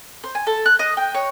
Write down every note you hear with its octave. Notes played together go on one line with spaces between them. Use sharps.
C5
G#5
A4
F#6
D#5
G5
C#5